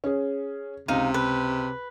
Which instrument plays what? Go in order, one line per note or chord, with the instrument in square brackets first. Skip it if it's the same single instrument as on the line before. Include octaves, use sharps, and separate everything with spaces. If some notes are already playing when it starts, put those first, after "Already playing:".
[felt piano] C#4 G#4
[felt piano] C#2 [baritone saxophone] C3 [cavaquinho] D#4 F5
[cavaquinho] B4